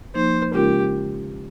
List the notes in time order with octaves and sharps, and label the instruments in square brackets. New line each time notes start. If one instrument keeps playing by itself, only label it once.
[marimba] F3 A#3 D#4 [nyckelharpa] C5
[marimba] C#3 G#3 C#4 F4 A#4 [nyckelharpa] G4